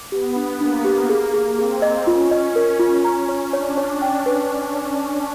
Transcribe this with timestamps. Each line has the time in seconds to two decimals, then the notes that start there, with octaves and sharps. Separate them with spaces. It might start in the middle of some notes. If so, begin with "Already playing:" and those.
Already playing: D6
0.12 B3 G4
0.36 D4
0.60 A#3 D4
0.85 G4
1.09 G#4
1.34 G#4
1.58 C4 G#4
1.82 D#5
2.07 C#4 F4
2.31 D#5
2.56 A#4
2.80 F4
3.05 A#5
3.29 C#5
3.53 D4 C#5
3.77 C#5
4.02 G5
4.26 B4